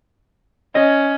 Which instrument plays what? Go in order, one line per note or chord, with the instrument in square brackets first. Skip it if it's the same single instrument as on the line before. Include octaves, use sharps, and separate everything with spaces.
[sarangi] C#4 [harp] D#5